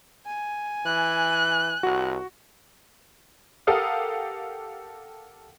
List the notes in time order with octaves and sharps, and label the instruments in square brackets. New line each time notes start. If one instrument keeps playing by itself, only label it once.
[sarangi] G#5
[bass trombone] E3 [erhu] F#6
[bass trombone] C2 [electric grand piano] F#4
[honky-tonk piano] G4 A4 A#4 F5 F#5 D#6